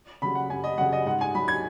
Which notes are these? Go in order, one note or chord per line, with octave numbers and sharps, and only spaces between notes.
C#3 F#3 B5
F#5
F#2 G#5
D#5
C#3 F#3 F#5
D#5
G#2 F#5
G#5
F#3 B5
G#6